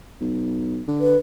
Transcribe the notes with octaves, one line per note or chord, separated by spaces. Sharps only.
B1
D3
B4